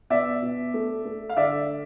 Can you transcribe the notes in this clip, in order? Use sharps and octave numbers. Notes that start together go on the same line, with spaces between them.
B2 D5 E5
B2
A3
A3
F5
D3 D5 E5